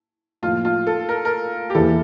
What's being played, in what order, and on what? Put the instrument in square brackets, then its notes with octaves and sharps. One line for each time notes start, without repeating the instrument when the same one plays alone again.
[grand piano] A2 F3 A#3 [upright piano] F4
[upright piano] F4
A4
A#4
A#4
G4
[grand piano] E2 E3 A#3 E4 [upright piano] A4